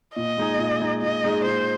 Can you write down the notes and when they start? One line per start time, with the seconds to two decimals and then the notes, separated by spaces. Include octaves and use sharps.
0.16 A#2 D#5
0.37 G#3 D#4 G#4
0.58 A#2
0.80 G#3 D#4 G#4
1.01 A#2 D#5
1.24 G#3 D#4 G#4
1.45 A#2 C5